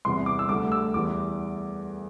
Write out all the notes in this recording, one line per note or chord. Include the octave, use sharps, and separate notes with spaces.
E2 C3 E3 G3 C6
D6
E6
D2 D3 G3 D6
E6
E2 E3 G3 D6